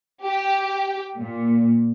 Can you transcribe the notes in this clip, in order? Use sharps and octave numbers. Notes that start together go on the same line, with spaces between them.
G4
A#2